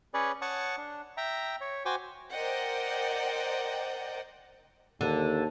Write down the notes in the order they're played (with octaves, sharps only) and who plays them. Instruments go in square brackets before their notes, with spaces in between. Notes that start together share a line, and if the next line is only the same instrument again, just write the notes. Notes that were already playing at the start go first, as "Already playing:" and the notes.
[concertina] C#4 G#4 B4 C#5 D5
C#5 F#5 A5 C#6 D#6
D4
E5 G5 A#5
C#5
F#4 C5 G5 G#5 D6
[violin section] A#4 C5 D5 D#5 F#5 G5
[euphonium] D#2 [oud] D3